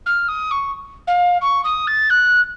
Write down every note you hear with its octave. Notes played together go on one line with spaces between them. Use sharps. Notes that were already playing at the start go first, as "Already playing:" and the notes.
F6
D#6
C#6
F5
C#6
D#6
A6
F#6